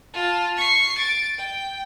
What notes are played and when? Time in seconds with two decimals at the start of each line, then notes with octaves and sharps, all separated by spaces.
0.14 F4 A5
0.57 C#6 C7
0.98 A6 D7
1.38 G5